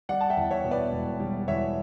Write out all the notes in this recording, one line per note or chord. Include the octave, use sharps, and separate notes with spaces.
G3 D5 F#5
A5
E5 G5
E2
C#5 E5
B2
B4 D5
E1
G3
E2 C#5 E5